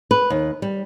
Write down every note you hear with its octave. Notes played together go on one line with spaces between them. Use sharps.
B4
D#2
G3